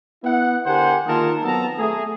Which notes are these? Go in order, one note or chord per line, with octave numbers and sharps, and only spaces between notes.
B3 E4 F#5
D3 G4 A#4 C5 F#5 G#5
D#3 A#3 F4 G#4 A#4 A5
F#3 B3 C4 A4 A5 A#5
A3 G#4